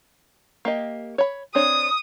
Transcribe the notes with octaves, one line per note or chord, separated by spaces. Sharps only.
A#3 G4 D#5
C#5 B5
C4 D4 C#5 D#6